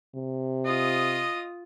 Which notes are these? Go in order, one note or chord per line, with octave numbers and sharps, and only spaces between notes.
C3
F4 D#5 D#6